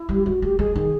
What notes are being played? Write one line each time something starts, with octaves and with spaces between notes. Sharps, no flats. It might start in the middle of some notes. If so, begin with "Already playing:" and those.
Already playing: E4
G3
G4
G#3 F#4
A3 G4
G#3 G#4
D#3 G#4